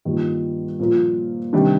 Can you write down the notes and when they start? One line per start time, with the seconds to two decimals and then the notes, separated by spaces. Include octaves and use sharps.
0.05 G2 D#3 G3 A#3 F4
0.80 A#2 F3 A#3
1.53 C3 D#3 G3 D4